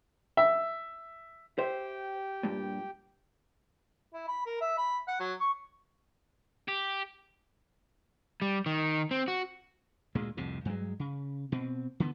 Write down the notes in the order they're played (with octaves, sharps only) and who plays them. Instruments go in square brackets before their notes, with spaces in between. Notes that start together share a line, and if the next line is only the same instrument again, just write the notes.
[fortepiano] E5
[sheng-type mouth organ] G4 G5 [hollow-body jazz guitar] C5 E5
[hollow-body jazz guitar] G2 A#2
[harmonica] E4
B5
A#4
E5
B5
F#5
F#3
C#6
[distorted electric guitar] G4
[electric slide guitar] G3
D#3
C4
F#4
[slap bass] D2 A#2 G#3
C2 F2 A2 C3
G2 F#3 G#3
C#3
B2 C4
D3 E3 B3